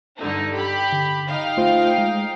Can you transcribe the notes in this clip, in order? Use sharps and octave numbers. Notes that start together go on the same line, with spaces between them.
G2 D3 D#4
G4 B5
D3
D#4 F5 G5
A3 F4 C5
G#3